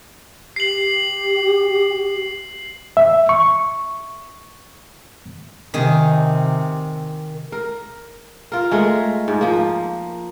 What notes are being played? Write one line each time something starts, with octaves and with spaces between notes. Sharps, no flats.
G4 C7 F#7
E5
C#6
C3 D#3 G#4
A#4
F4 A#4
G#3 A3 A#4
G#2
F3 A#3